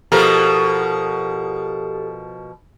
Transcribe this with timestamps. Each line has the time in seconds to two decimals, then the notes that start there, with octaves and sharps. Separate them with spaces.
0.12 B2 F3 G4 A4 A#4